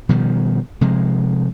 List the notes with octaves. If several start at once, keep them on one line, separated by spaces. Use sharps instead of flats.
B2 D#3 F3 G3
C3 F3 G#3